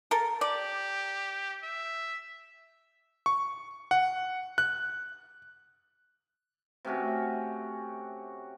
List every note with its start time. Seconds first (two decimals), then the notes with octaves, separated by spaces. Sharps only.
0.11 A4 A#4
0.41 G4 D5
1.63 E5
3.26 C#6
3.91 F#5
4.58 F#6
6.85 C3 A3 C#4 F#4